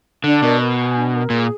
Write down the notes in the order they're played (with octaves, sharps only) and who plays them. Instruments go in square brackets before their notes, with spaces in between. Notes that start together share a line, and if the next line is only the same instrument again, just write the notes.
[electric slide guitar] D3 [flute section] D4
[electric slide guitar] B2 [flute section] A#4
[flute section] A#4
G#5
D4
A#4
[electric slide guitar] A#2 [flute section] G#4